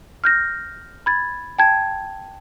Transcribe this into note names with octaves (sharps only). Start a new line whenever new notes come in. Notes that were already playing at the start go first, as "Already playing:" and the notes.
F6 G6 A#6
B5 G#6 A6
G5 A5 G#6